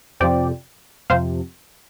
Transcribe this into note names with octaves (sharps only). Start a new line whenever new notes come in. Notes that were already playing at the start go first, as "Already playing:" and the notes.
F2 C3 F3 D5 G5
F2 C3 F3 C5 F5